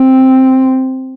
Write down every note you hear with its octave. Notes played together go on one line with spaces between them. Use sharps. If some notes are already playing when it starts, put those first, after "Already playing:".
Already playing: C4